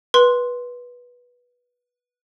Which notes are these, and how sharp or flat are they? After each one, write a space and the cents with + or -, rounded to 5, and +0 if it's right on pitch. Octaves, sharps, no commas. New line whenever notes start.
B4 -15 C6 +0